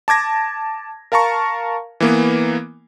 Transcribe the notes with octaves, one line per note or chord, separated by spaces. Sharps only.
A5 D6 G#6 A#6
A#4 F5 A5 A#5 C#6
E3 A#3 B3